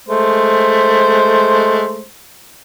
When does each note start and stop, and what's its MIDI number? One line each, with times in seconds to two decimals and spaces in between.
0.09 2.05 56
0.09 2.05 57
0.09 2.05 72